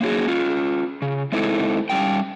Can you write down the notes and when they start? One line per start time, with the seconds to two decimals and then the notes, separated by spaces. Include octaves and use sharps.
0.01 A#3 C#4 D#4 F#4 G#4
0.27 C#4 F4
1.02 C#3
1.32 G#3 A3 C4 D#4 E4 A4
1.89 G3 C#4 G5